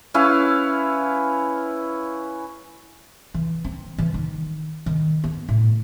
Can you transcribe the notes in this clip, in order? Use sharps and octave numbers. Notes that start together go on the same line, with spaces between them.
C#4 E4 B4 F5
E3
C4
E3
D#3
D#3
B3
A2